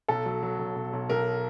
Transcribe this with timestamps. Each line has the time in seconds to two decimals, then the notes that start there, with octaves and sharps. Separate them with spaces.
0.08 B1 A4
0.25 F#3
0.43 F#3
0.59 B1
0.76 B1
0.93 B1
1.10 B1 A#4